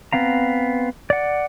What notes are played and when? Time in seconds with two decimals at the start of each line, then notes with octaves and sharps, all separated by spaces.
0.13 B3 C4 F5 A#5
1.10 D5 F#5